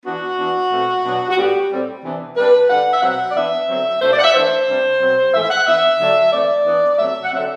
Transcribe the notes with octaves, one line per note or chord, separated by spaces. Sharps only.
E3 B3 D4 F#4
E3 B3 D4
B2 A3 C4
B2 F#3 B3 D4
F#4
A2 G3 B3 D4 G4
A2 G3 C4
C3 E3 B3 D4
C3 G3 D4 B4
D3 G3 D4 F#5
E5
B2 F#3 C4 F#5
D5
E3 B3 D4 E5
D3 F#3 C4
B2 A3 D4 C5
D5
F#5
E5
E3 A3 D4 C5
C3 G3 D4
B2 F#3 C4
A2 E3 A3 E5
E5
F#5
E3 B3 D4 E5
D3 F#3 A3 D4
E3 A3 C4 D5
E3 B3 D4
C3 F#3 A3 E5
F#5
D3 F#3 C4 E5